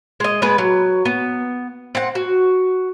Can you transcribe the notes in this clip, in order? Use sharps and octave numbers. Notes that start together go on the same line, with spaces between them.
G#3 D#5
G#3 B3 B4
F#3
B3
C4 F#5
F#4